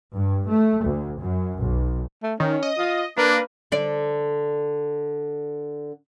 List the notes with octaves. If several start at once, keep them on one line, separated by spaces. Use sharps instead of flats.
G2
A3
D2
F#2
B1
A3
D#3 C#4
D#5
F4
A#3 D4 B4
D3 D5